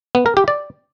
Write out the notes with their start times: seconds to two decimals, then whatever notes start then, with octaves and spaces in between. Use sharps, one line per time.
0.15 B3
0.26 A#4
0.37 G4
0.48 D5